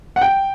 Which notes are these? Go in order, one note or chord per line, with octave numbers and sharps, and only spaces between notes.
F#5
G5